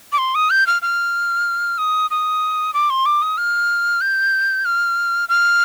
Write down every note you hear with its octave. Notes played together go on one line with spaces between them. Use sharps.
D6
C6
D#6
G6
F6
F6
D#6
D#6
D6
C6
D6
D#6
F6
G6
F6
F6